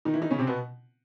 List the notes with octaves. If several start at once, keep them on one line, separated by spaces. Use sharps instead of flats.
D#3 D#4
E3 E4
D#3 D#4
C#3 C#4
C3 C4
B2 B3